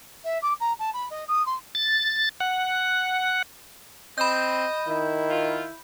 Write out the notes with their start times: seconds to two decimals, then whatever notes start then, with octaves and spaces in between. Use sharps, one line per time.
0.24 E5
0.42 D6
0.60 A#5
0.79 A5
0.94 B5
1.10 D#5
1.28 D#6
1.46 C6
1.75 A6
2.41 F#5
4.18 C4 D#5 B5 G6
4.88 D#3 E4
5.29 F4